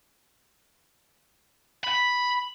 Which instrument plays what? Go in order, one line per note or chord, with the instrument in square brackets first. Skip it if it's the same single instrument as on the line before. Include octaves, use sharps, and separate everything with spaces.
[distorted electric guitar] B5